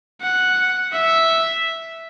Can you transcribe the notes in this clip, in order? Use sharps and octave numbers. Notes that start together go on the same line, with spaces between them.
F#5
E5